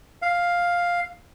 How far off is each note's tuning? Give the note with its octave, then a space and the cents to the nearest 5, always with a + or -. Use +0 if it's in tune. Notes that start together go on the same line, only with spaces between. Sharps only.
F5 +5